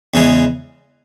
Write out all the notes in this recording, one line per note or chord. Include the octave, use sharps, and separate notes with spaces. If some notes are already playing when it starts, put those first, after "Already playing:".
E2 C#3 E3 G#3